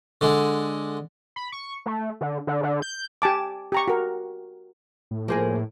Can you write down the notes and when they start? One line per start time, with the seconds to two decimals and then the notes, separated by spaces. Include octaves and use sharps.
0.21 D3 G#3
1.36 B5
1.52 C#6
1.86 A3
2.21 D3
2.47 D3
2.63 D3
2.82 G6
3.22 G4 G#5 A5 D6
3.72 G4 A#5 C#6
3.88 F#4 A#4
5.11 A2
5.28 F3 A#3 G#4 A#4 C5 G#5